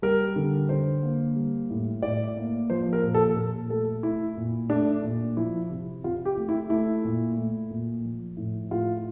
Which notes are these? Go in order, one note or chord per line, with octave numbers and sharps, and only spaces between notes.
G3 A#4
D3
D3 C5
A#3
G3
A2
A2 D5
A#3
F3 C5
A#4
A#2
A4
A#2 A4
A3 A4
A3 E4
A#2
A3 D4
A#2
F3 E4
C3
C3 F4
G4
A3
E4
A3 E4
A#2
A3
A#2
F3
A2
A2 F4